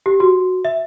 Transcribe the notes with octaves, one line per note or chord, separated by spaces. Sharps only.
G4
F#4
E5